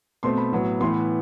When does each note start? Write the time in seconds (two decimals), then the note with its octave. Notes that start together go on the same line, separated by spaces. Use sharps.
0.23 B2 A3 C4 C6
0.38 B5
0.52 A2 F#3 B3
0.80 A2 E3 B3 C6